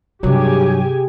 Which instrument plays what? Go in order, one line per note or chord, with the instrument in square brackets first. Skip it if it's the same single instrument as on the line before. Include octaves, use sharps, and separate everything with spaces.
[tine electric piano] G2 F#3 [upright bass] C3 D#3 [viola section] G4 G#4 G#5